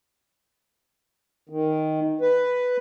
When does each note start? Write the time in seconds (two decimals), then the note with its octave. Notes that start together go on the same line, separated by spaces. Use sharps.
1.49 D#3
2.21 B4